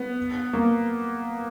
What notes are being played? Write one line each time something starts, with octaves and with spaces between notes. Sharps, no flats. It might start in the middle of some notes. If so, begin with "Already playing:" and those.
Already playing: B3
A#3